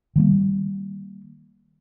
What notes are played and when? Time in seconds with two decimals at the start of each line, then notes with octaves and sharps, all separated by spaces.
0.16 D#3 G3 A#3